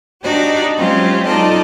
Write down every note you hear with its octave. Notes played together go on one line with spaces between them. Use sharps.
D4 D#4 F#4 G4 D5
F#3 G#3 C4 C#4 F4 G4
D#4 F4 A4 D5 D#5